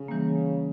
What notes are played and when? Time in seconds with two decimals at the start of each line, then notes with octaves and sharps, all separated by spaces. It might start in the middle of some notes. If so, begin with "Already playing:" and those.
Already playing: C#3
0.08 E3 G3 A#3